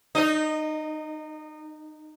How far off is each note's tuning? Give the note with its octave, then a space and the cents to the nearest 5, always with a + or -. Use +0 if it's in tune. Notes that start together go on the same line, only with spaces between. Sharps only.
D#4 -25 D#5 +0